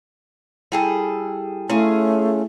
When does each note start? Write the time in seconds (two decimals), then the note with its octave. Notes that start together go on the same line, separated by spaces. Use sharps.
0.72 G3 E4 G#4 A4 G5
1.69 A3 C#4 E4 F4 G#4